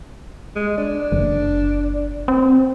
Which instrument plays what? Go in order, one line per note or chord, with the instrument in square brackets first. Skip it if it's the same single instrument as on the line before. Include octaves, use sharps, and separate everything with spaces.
[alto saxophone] G#3
D4
[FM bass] F#1
C4